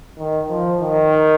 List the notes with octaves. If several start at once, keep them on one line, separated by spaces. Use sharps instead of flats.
D#3
F3
D#3